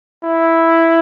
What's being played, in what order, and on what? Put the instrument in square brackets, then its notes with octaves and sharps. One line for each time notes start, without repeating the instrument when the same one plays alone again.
[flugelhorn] E4